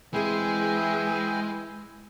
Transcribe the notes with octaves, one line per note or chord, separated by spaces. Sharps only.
E3 G#3 C4 E4 G#4 G5 G#5